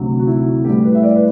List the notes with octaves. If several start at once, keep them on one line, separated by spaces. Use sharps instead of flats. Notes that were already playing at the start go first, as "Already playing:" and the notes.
Already playing: D2 C3 F#3
F#4
E4
A2 E3 G3 G4
B4
E5
D5
B4